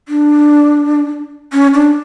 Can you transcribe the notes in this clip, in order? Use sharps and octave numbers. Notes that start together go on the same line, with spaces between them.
D4
C#4
D4